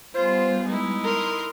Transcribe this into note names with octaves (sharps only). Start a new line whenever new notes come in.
G3 B3 F4 G#4 C5
G#3 D#4 E4
A#4 C6 D#6